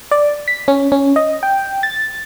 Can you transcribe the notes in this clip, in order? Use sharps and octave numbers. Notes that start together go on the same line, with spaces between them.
D5
B6
C#4
C#4
D#5
G5
A6